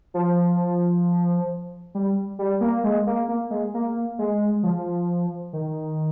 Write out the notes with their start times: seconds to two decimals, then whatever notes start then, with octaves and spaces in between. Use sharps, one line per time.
0.14 F3
1.95 G3
2.39 G3
2.61 A#3
2.84 G#3
3.07 A#3
3.28 A#3
3.50 G#3
3.74 A#3
4.19 G#3
4.63 F3
5.53 D#3